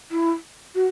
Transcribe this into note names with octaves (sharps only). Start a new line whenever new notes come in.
E4
F#4